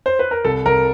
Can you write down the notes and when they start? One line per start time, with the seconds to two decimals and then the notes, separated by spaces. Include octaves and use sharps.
0.06 C5
0.19 B4
0.31 A#4
0.44 C2 A4
0.65 C2 A#4